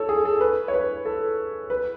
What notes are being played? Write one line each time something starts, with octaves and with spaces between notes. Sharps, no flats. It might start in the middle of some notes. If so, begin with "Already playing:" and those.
Already playing: A4 C#5
G#4
A4
B4
C#5
B4
A4
B4